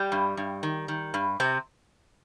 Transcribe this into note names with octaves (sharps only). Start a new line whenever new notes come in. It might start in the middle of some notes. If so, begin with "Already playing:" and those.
Already playing: G3 G4
G2
G2
D#3
D#3
G2
C3 C4